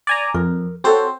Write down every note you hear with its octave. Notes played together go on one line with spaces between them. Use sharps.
D5 G#5 A#5
F2 A#4
C4 F#4 A4 C5 C#5